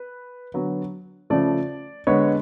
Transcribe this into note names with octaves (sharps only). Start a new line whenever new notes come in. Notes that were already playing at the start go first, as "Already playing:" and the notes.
Already playing: B4
D3 F#3 B3
C#3 F3 A3 D5
D3 G#3 B3 C#5